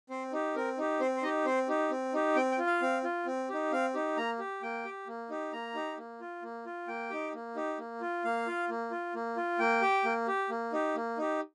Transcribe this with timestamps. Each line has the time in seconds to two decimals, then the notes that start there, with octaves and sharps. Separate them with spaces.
0.10 C4 C5
0.33 D#4 G4
0.56 C4 A#4
0.78 D#4 G4
1.00 C4 C5
1.17 C5
1.23 D#4 G4 D#5
1.46 C4 C5
1.68 D#4 G4
1.91 C4
2.14 D#4 G4
2.36 C4 G5
2.51 G5
2.58 F4
2.66 F5
2.82 C4
3.04 F4
3.26 C4
3.49 D#4 G4
3.72 C4 F5
3.94 D#4 G4
4.17 A#3 A#5
4.39 G4
4.62 A#3 G5
4.85 G4
5.07 A#3
5.30 D#4 G4
5.53 A#3 A#5
5.75 D#4 G4
5.98 A#3
6.21 F4
6.42 A#3
6.66 F4
6.88 A#3 G5
7.10 D#4 G4
7.34 A#3
7.56 D#4 G4
7.79 A#3
8.01 F4
8.24 A#3 F5
8.47 F4
8.69 A#3
8.91 F4
9.15 A#3
9.37 F4
9.59 A#3 G5
9.82 G4
10.05 A#3
10.27 G4
10.50 A#3
10.73 D#4 G4
10.96 A#3
11.18 D#4 G4